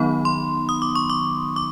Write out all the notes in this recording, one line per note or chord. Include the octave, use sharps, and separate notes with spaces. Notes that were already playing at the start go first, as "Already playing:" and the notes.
Already playing: D#3 F#3 B3 D#4 B5
C6
D#6
D6
C#6
D6
D6